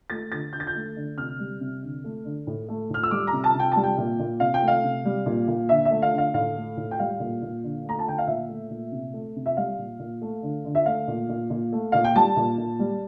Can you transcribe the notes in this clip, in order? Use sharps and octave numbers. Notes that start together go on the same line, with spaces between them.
A3 A6
D3 A6
D3 G6
A6
G6
A3
D3
C3 F6
G3
C3
D3
A3
D3
A2
A3
A2 F6
E6
G3 D6
A#5
C3
A5
C3
G5
G3 A5
G5
A#2
A#2
C3 F5
G5
A3
F5
C3
G3
A#2
A#2
D3 E5
E5
A3
F5
D3
F5
A2 F5
A3
A2
G5
G3 F5
A#2
A#2
D3
A3 A#5
A5
D3 G5
F5
A#2 E5
A3
A#2
C3
A3
C3
E5
G3 F5
A#2
A#2
A3
D3
D3
E5
A3 F5
A#2
A#2
A#2
A3
A#2 F5
G5
G3 A5
A#2
A#2
G3